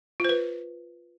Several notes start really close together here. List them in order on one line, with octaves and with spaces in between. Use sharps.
F4 C5 B4